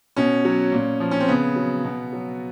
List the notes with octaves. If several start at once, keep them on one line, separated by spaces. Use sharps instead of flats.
B2 C#4
F#3
A#2
F3
C#4
C4
C#3 B3
F#3
B2
F#3